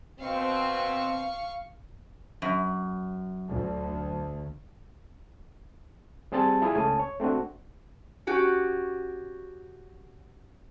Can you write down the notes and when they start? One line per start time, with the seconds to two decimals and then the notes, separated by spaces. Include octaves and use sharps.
0.20 B2 C4 F5 C#6
2.42 F#2
3.47 D2
6.32 G3 C4 G#4 A5 A6
6.62 E4 F4 G#4
6.75 C#2 A3 C#4 G#5 A5 D#6
6.99 C#5
7.20 A3 C4 D4 F#4
8.27 C#4 F#4 G4